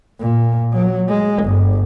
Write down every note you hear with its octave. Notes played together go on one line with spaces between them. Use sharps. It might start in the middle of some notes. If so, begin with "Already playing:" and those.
A#2
F#3
G#3
G1